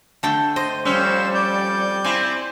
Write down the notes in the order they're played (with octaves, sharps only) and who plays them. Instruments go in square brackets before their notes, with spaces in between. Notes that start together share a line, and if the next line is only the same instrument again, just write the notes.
[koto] D3 A3 G5
[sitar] C5 [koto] D#5
[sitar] F2 C#4 [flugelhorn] G3 [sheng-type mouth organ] C5 E6
[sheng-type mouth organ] D5 G6
[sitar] C4 E4 [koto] G#5